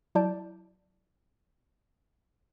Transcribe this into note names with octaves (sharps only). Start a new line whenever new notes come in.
F#3 E4 D5 A5 G6 D7